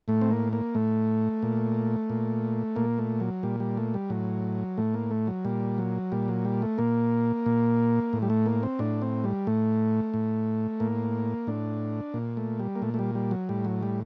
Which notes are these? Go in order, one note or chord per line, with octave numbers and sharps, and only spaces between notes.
A2 A3
C4
A#3
A#3
A2 A3
A#2
A#2
A#2 A#3
A3
F#3
A#2 G3
G3
A3
G3
A2 F#3
A2 A3
A#3
A3
F#3
A#2 G3
F#3
A#2 G3
F#3
G3
A3
A#2 A#3
A#2
A2
G3
A3
A#3
C4
A2 D4
C4
G3
A2 A3
A2
A2 A#3
A2 D4
A#2
A3
G3
A#3
A#2 A3
A3
G3
G3
F#3
A2 G3
F#3
G3